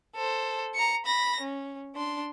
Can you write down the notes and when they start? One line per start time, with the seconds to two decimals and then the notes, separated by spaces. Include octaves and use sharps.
0.15 A4 C5
0.75 A#5 C#7
1.06 B5 A#6
1.41 C#4
1.95 D4 C6